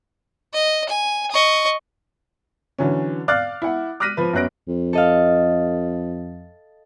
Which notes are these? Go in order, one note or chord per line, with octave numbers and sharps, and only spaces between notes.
D#5
G#5
D#5 C#6
D3 E3 F#3 C#4
D5 F5 D6 F6 F#6 A6
E4 F#5
D6 F6 F#6 A#6 B6 D#7
F3 B4
F#2 B3 C#4 F#6 A#6 D7
F2
A4 D#5 F5